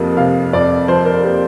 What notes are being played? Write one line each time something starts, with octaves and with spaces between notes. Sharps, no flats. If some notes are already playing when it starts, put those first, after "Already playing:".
Already playing: F2 C3 F3 A#3
C3 F5
F2 D5
F3 C5
A#4
A#3 G4